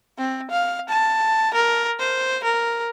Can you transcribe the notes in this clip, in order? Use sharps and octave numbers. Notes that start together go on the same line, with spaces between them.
C4
F5
A5
A#4
C5
A#4